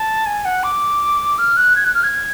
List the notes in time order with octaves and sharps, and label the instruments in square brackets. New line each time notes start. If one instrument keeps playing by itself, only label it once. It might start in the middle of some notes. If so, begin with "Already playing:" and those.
Already playing: [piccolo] A5
G#5
F#5
D6
F6
F#6
G#6
F#6
F6
G#6